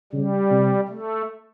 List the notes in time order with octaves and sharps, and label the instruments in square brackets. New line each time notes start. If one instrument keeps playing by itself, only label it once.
[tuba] C#3 [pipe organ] G3
[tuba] C3
[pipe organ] A3